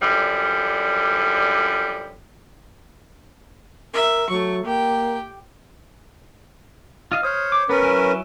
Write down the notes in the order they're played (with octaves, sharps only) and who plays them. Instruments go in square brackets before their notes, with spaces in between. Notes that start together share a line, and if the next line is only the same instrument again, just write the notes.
[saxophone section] F#2 D3 F3 G3
[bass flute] A#4 [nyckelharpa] E5
[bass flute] F#3 [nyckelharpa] A3 C#6
[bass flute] A#3 [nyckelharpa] G4 G5
[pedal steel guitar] F4 D#5 F5
[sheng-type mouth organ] C5 C#5 [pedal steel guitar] D#6 F6
[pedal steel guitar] D6
[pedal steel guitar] B3 [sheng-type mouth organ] C#4 A#4 B4
[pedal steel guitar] F#3 E4 G#5